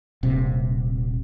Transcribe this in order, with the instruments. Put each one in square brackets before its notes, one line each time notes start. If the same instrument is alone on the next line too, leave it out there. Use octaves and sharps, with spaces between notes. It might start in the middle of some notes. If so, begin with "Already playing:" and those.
[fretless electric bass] D#1 C3